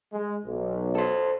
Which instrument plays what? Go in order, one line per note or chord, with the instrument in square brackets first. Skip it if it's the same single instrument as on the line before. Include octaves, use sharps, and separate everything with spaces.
[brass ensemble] G#3
B1
[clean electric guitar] A4 C5